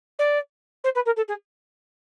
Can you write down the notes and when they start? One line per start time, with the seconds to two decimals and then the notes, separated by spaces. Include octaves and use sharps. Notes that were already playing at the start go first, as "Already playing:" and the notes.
0.19 D5
0.84 C5
0.95 B4
1.05 A#4
1.16 A4
1.28 G#4